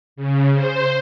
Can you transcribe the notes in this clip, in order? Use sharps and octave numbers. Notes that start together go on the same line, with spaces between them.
C#3
C5